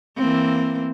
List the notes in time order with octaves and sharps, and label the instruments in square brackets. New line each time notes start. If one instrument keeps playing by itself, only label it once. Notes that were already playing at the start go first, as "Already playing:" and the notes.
[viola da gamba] E3 A#3 C4